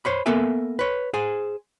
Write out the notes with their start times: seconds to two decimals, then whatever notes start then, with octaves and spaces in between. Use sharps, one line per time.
0.05 C5 C#5 B5
0.26 A#3 B3 A4 A#4 E5 G#5
0.79 B4 C#5
1.14 G#4 C5 G#5